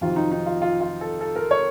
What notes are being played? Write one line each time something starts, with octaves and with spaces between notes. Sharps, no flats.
F2 C3 D#3 F#3 C4 F4
D#4
D#4
F4
F4
F4
A4
A4
A#4
C#5